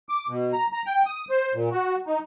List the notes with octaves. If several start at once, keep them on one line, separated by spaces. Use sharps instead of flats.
D6
B2
A#5
A#5
G5
D#6
C5
A#2
F#4
D#4